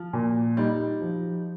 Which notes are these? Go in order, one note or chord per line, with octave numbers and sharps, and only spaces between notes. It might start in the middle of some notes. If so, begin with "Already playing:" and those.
Already playing: F3
A#2
G3 D#4
F3